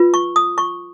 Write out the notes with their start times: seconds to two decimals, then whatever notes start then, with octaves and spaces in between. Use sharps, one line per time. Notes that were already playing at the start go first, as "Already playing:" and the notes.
Already playing: F4 B4
0.14 C#6
0.36 D#6
0.58 C#6